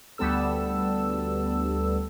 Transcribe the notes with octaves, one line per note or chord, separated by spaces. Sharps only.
D2 G3 B3 A4 E6